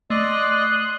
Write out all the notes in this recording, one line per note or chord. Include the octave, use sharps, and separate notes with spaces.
A3 D5 D#5 C6 D#6 F#6